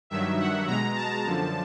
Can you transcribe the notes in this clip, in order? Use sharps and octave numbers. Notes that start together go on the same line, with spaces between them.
G2 D#3 F#3 E5
F#5
B2 G#3 A#5
A5
F#2 D3 F3